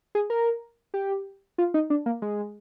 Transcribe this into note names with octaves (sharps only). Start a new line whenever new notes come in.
G#4
A#4
G4
F4
D#4
D4
A#3
G#3